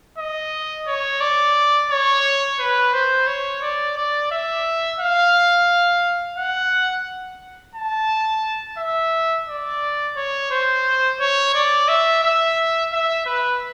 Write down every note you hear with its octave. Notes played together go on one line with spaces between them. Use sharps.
D#5
C#5
D5
C#5
B4
C5
C#5
D5
D5
E5
F5
F#5
A5
E5
D5
C#5
C5
C#5
D5
E5
E5
E5
B4